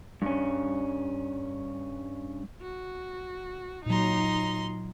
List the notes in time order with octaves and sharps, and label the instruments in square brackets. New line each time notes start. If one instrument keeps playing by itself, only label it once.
[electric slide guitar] G2 C#4
[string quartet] F#4
[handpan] A#2 F#3 [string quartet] D#4 A#5 C6